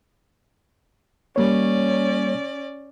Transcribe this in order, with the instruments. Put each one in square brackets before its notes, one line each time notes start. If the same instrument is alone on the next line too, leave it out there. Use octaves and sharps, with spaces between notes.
[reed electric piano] G3 A#3 C#5 [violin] C#4 D5